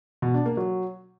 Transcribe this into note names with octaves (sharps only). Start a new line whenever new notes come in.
B2
D4
A#3
F#3